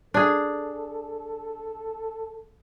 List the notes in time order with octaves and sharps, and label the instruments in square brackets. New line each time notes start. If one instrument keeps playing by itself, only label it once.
[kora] D4 G#4 [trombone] A4